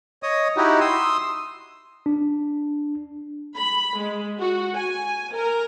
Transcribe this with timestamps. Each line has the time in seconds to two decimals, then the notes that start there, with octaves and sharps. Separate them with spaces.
0.23 C#5 D#5 D#6
0.57 D#4 E4 F#4 G4
0.80 C6 D#6 E6
2.06 D4
3.56 B5
3.97 G#3
4.38 F#4
4.75 G#5
5.35 A#4